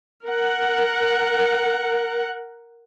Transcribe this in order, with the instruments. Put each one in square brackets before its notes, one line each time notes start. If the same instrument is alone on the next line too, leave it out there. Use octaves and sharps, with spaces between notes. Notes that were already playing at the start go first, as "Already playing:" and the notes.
[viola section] A#4 F#5